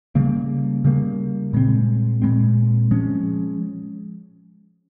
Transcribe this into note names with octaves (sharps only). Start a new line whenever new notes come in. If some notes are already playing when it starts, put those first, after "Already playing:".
C#3 G3 A#3
C#3 G3 A#3
A#2 G#3 C4
A#2 G#3 C4
F3 G#3 C#4